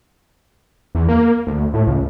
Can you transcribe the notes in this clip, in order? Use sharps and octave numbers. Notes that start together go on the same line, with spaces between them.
E2
A#3
D2
A2
C#2